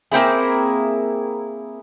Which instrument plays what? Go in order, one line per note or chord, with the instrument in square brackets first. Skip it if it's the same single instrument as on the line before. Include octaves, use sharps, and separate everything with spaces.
[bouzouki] A#3 C4 E4 G#4